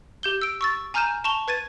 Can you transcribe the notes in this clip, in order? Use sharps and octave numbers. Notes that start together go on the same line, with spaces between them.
G4 G6 G7
E6 D7
C#6 E6 A6
G#5 A#5 F6 G6 D#7 E7
A5 C#6 E7 F7 G7
B4 G#6 A6 D#7